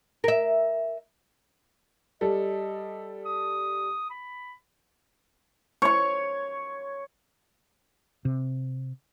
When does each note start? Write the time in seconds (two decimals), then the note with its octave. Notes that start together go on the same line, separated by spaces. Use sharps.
0.24 A#4 E5
2.21 G3 A4 D#5
3.25 D#6
4.10 B5
5.82 C#5 C#6
8.25 C3